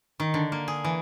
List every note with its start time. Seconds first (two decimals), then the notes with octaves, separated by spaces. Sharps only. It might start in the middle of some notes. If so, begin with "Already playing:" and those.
0.20 D#3
0.34 D3
0.52 A#3
0.68 G#4
0.84 E3